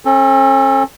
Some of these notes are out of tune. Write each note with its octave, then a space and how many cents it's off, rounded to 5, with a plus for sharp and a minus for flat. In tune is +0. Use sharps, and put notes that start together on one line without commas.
C#4 -45 A4 +0